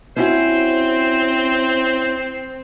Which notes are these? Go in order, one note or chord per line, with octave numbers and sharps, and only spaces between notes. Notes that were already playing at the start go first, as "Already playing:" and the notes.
C4 C#4 E4 F#4 C5